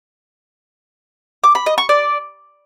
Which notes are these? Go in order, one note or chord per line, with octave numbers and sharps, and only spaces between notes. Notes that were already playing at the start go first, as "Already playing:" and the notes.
D6
B5
D#5
C#6
D5